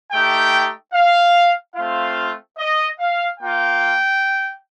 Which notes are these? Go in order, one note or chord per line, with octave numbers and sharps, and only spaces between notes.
A3 D#4 G4 G5
F5
A3 C4 F4 F5
D#5
F5
A#3 F4 G5